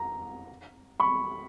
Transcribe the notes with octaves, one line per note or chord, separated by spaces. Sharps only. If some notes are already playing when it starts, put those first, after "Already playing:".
Already playing: A#5
B5 C#6